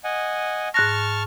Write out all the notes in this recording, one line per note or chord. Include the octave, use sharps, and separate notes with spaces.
D#5 F#5 G#5
G#2 A5 C#6 F6 F#6 A#6